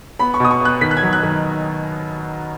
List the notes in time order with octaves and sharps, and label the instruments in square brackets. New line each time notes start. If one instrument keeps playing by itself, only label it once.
[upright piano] B3 B5
C#6
B2 D#6
C#6
B3 F#6
D#3 B6
F#6
G#6
F#3
F#6
D#3